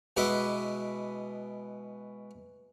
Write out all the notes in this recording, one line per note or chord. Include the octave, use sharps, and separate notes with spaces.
B2 G#3 E4 B4 D6